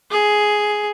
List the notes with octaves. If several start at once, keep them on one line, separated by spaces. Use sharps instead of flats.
G#4